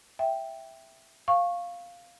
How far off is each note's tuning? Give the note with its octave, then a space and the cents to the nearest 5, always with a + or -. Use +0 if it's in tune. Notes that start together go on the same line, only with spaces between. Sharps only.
E5 +0 G5 +0
F5 +0 C#6 -15